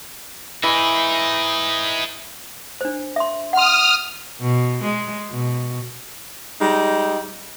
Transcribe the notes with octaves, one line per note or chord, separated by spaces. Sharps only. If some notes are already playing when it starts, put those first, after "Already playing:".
E3 D#4 G#4
D4 C5
E5 C6
F#5 C6 D#6 F6
B2
G#3
B2
G3 G#3 D#4